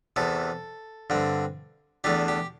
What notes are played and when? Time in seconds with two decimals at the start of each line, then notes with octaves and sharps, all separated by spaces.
0.16 E2 C3 E3 A4
1.10 G2 D3 C4
2.04 E2 E3 A3 D4 G4
2.28 G4